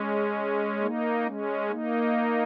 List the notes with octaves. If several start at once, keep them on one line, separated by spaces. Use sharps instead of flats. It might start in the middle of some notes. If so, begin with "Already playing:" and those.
Already playing: G#3 C#4
A#3 D#4
G#3 C#4
A#3 D#4